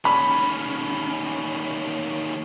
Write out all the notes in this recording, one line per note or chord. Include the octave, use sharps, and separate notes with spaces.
D#2 C#4 B5